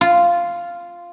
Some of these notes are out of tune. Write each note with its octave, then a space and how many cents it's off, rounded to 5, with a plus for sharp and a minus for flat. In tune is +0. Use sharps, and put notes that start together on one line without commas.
F4 -5